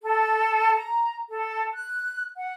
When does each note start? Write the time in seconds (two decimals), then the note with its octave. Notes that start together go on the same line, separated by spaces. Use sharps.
0.01 A4
0.77 A#5
1.30 A4
1.72 F#6
2.37 F#5